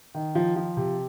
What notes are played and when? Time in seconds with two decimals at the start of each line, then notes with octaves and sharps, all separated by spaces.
0.14 D#3
0.35 F3
0.56 F3
0.77 C3